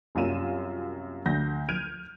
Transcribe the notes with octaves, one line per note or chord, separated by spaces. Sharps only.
C2 F#2 A#3 F4 D#7 E7
D2 G6 A#6
F6 G6 G#6 D7 D#7 F7